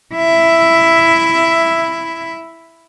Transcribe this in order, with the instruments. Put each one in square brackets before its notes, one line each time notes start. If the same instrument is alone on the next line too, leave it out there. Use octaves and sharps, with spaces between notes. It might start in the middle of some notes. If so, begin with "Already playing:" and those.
[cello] E4 E5